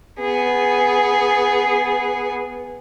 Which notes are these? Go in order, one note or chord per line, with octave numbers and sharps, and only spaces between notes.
B3 G#4